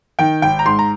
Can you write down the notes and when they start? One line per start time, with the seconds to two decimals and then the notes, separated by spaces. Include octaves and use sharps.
0.19 D#3 G5
0.42 G#1 G5
0.59 A#5
0.65 G#2 C6
0.79 A#5